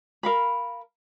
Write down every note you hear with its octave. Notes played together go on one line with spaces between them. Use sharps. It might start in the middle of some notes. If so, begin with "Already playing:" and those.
A#4 F5 B5